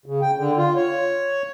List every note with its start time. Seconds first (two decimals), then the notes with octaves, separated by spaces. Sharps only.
0.06 C#3
0.21 G5
0.37 D3
0.57 F4
0.76 C#5